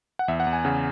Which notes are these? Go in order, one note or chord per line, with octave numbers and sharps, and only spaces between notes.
F#5
E2 E5
F#5
E2
G#5
C#3 G#5